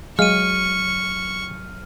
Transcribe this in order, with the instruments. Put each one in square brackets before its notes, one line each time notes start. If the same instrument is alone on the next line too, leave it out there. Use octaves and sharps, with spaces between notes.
[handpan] F#3 [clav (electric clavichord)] G#3 F5 [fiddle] C#6 [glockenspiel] F6 D#7